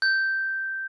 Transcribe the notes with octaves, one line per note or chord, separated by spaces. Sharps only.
G6